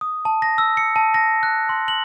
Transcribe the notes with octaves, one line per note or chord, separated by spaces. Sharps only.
D#6
A5
A#6
E6
C#7
A5
A#6
F#6
C6
F#7